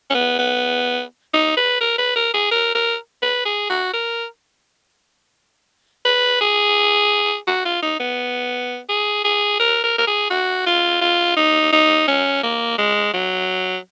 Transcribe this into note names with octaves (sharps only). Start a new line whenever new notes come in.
C#4
B3
B3
D#4
B4
A#4
B4
A#4
G#4
A#4
A#4
B4
G#4
F#4
A#4
B4
G#4
F#4
F4
D#4
B3
G#4
G#4
A#4
A#4
A#4
G#4
F#4
F4
F4
D#4
D#4
C#4
A#3
G#3
F#3